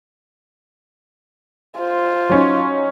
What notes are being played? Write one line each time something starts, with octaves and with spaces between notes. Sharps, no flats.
F4 C5
F#3 C#4 D#4